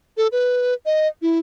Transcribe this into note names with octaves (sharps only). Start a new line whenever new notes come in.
A4
B4
D#5
E4